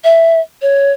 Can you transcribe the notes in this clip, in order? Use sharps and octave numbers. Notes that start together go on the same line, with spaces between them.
E5
C#5